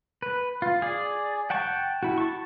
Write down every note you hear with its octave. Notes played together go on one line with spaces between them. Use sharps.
B4
F4
G#4 D5
F#5 G5 A5 C#6
E4 F#4
A5 C#6